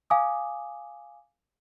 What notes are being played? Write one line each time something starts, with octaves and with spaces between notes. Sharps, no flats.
F5 G#5 D6 D#6